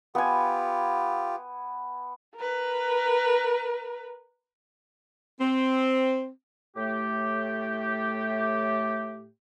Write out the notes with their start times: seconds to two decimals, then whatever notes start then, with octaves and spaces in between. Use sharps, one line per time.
0.15 B3 F4 G4 G#5
2.36 A#4 B4
5.40 C4
6.76 A2 A3 G4